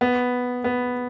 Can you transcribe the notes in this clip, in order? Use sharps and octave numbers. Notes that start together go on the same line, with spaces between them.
B3
B3